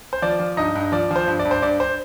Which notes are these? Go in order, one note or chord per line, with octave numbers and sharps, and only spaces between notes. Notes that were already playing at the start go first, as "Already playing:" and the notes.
C5
F3 D5
F3
G2 D#4 D#5
G2
F3 D5
F3 C5
G2
D5
G2
C5
G2 D5
C5